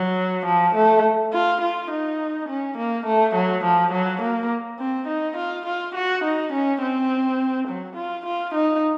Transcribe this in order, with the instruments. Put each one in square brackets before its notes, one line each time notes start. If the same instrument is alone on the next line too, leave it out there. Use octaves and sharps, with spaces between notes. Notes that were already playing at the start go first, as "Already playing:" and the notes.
Already playing: [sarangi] F#3
F3
A3
F4
F4
D#4
C#4
A#3
A3
F#3
F3
F#3
A#3
C4
D#4
F4
F4
F#4
D#4
C#4
C4
F#3
F4
F4
D#4